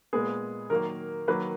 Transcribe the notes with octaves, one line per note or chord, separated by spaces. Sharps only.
A#2 G#3 B3 G#4
D#3 F#3 A#3 A#4
D#3 F#3 A#3 B4